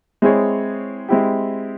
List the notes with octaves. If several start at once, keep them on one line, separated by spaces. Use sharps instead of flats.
G#3 C4 E4 G#4 C#5
G#3 C4 E4 G4